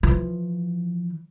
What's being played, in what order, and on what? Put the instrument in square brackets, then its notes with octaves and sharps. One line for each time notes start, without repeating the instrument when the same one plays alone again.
[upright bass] E3 F3